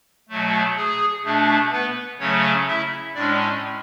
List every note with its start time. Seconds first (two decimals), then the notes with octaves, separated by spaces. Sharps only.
0.29 B2 F#3 A3
0.76 G#4
1.24 B2 A3 D4
1.71 B3 B4
2.19 C#3 F#3 A3 C#4 C#5
2.67 E4 E5
3.15 A2 G#3 C#4 D4 D5